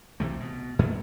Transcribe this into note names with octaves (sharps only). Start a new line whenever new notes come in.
B1 C3 E3 A3
B2
F#2 B2 A3 A#3